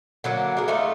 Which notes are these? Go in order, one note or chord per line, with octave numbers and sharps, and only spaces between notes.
D3 F#3 A#3
D4 G#4 A#4
A3 D#4 F4